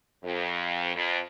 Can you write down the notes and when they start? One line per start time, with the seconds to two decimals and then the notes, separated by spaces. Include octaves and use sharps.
0.23 F2
0.95 F2